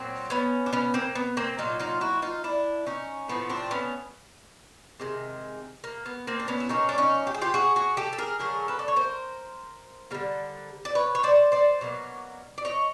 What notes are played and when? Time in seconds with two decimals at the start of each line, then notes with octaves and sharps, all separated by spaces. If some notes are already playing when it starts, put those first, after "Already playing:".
Already playing: A#2 F#3 C4
0.30 B3 C#4
0.66 D4
0.73 B3 C#4
0.94 A#3 C4
1.15 B3
1.37 A#3 C4
1.58 A#2 F#3 A#3 D#4 F4
1.80 D#4 F4
2.01 E4 F#4
2.22 D#4 F4
2.44 D4 E4
2.87 C#4 D#4
3.28 A2 F3 A3 B3
3.50 C4 D4
3.71 B3 C#4
5.00 C3 D#3 G#3
5.84 A#3
6.06 B3
6.27 A#3 C4
6.40 D4
6.48 B3 C#4
6.60 E4
6.69 B2 F#3 A#3 C#4 D#4
6.89 D4
6.98 C#4 D#4
7.27 G4
7.34 G#4
7.41 F4 G4
7.54 F#4 G#4
7.76 F#4 G#4
7.97 G4 A4
8.13 A4
8.18 G#4 A#4
8.39 D3 F#3 A3 G#4 A#4
8.68 A4 B4
8.79 D5
8.88 C#5
8.96 A#4 C5
10.11 D3 G3 A#3
10.85 D5
10.95 B4 C#5
11.15 C#5
11.23 C5 D5
11.52 C5 D5
11.81 B2 F#3 A#3
12.58 D5
12.65 C#5 D#5